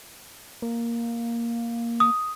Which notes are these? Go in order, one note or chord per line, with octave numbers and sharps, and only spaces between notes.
A#3
D#6